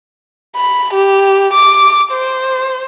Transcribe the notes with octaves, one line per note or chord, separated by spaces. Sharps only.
B5
G4
D6
C5